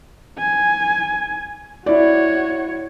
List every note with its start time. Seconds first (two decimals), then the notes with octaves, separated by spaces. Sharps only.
0.38 G#5
1.86 E4 F#4 C#5 D5